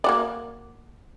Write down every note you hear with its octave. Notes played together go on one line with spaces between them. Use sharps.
A#3 F#4 D5